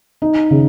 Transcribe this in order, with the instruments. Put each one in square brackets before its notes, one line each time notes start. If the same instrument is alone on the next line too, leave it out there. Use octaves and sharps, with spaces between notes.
[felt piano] D#4
C#3